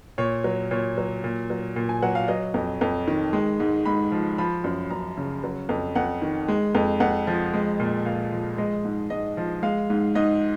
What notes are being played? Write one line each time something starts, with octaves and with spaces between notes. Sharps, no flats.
A#2 C#5
F#3
A#2 C#5
F#3
A#2
F#3
A#2
G#5
F#3 F#5
F5
F#3 D#5
F2
F2
D#3
G#3
G#2
G#2 B5
F3
F3 B5
F#2
F#2 A#5
C#3
F#3
F2
F2 F#5
D#3
G#3
F2
F2 F#5
F3
G#3
A#2
A#2 F5
F3
G#3 D#5
G#2
G#2 D#5
F3
G#3 F5
G#2
G#2 D#5